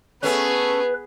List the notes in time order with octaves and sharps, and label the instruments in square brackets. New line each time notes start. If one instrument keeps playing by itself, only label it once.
[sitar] A3 C#4 [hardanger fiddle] B3 G#4 [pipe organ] B4